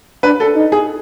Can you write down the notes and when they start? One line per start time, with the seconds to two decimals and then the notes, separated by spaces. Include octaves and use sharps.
0.23 D4 B4
0.40 A4
0.56 D#4
0.72 G#4